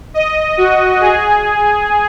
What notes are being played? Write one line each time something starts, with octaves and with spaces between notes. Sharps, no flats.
D#5
F#4
G#4